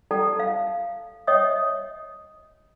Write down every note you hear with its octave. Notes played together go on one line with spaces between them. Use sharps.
A4 D5 G5 A5 A#5
F5 A5
C#5 D#5 E5 G5 D#6